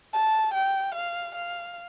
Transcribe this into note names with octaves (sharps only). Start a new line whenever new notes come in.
A5
G5
F5
F5